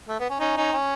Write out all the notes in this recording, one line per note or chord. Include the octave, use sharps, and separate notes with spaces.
A3
B3
C#4
C#4 D#4
C#4 D#4
C#4